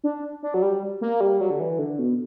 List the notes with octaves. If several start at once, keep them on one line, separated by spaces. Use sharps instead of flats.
D4
D4
F#3
G3
A#3
G3
F#3
D3
E3
D3
B2